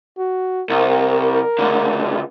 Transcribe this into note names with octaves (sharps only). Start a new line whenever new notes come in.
F#4
C2 A#4
C#2 D3